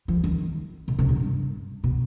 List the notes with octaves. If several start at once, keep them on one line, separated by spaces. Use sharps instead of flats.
F3
D#3
B2
C3
B2
G2
B2